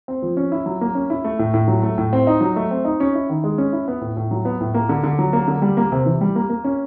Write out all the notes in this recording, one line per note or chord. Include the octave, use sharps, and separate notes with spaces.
C4
F3
C#4
E4
F#3
A#3
C#4
E4
A3
A2
A2
F#3
A3
A2
C4
D#4
F#3
A3
C4
D#4
C#4
E4
D#3
G#3
C#4
E4
B3
A2
A2
F#3
B3
A2
A#3
D3
D3
F#3
A#3
D3
G3
A#3
C3
E3
G3
A#3
A#3
C#4